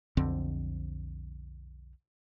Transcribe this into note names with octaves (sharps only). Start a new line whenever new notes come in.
B1 F2 D3 C4